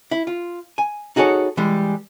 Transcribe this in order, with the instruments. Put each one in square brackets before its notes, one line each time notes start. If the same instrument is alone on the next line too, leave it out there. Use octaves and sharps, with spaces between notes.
[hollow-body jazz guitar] E4
F4
G#5
D#4 F#4 G#4 A4 C#5
E3 G3 G#3